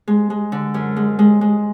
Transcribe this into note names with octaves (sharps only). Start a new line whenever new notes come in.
G#3
G#3
D3
F#2
G#3
G#3
G#3